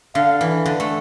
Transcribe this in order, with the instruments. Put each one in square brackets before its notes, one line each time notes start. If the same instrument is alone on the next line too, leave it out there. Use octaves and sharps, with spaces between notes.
[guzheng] D3 [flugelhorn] F5
[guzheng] E3
D3
A3